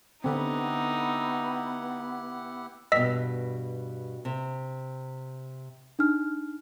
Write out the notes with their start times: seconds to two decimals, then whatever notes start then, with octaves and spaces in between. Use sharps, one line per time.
0.24 D3 B3 C4 D#4 E4 G4 F#5
2.92 G2 B2 D#5 E6 B6
4.25 C3
5.99 D4 D#4 F6